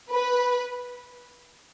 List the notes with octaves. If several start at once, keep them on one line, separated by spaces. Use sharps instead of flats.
B4